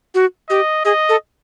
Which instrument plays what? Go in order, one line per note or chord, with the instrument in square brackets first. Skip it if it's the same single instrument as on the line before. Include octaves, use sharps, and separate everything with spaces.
[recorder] F#4
[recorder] G4 [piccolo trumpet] D#5
[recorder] G#4 [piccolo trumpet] D#5
[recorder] A4